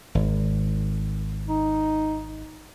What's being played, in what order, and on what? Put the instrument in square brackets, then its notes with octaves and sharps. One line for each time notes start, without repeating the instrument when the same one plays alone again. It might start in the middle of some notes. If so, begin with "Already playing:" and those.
[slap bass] G#1
[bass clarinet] D#4